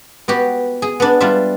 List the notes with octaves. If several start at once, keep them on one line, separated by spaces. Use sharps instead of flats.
B3 F#4 G4
G#4
B3 D4
G3 D4 F4 E5